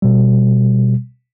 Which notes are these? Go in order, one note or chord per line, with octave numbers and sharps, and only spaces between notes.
B2 G3